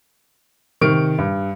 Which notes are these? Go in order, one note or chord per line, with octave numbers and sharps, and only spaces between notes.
C3 D#3 C#6 F6 D7
G2